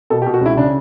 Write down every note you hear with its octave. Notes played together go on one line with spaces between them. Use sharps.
B2 A4
G4
B2
F#4
C#2 E4
C#3 D4